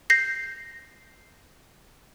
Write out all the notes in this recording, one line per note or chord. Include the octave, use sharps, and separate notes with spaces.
G6 A#6 C7